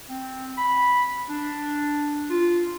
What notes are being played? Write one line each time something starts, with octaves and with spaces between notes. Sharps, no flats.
C4
B5
D4
F4